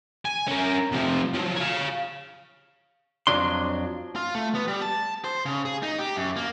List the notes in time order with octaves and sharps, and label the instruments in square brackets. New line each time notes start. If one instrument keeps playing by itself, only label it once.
[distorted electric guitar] G#5
C#4 A#4
C3 F3
F3 F#3
C#5 F5
[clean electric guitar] F2 A2 F3 F#3 D4 C6
[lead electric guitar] F4
A3
B3
G3
A5
C5
C#3
G#4
D#4
G4
F#2
A#3